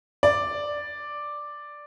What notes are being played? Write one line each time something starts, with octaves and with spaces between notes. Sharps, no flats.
D5